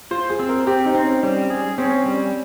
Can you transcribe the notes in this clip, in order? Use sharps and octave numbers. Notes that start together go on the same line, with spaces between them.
F4 C5
G#4
C4
A#4
C4 G4
D#4
C4
C#4
G3 C#4
G#4
C4 C#4
G3